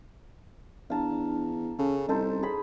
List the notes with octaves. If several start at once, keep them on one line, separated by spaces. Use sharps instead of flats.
E2 D4 F5 A5 A#5
C#3 C#4 A4
C2 D#4 A4 C5
G#4 B5